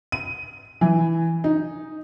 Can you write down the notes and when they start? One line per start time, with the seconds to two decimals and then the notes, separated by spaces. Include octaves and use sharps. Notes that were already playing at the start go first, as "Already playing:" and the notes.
0.12 D#7
0.81 E3
1.44 D#4